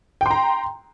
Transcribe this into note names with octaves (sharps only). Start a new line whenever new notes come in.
G5 A#5 C6